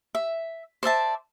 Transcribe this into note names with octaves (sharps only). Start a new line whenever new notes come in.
E5
C5 D5 E5 A5